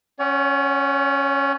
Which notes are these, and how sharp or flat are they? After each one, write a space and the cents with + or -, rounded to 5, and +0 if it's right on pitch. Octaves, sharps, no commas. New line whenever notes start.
C#4 -5 C#5 +45 F#5 +25